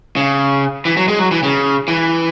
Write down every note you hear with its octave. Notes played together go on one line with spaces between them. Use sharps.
C#3
E3
F#3
G#3
F#3
E3
C#3
E3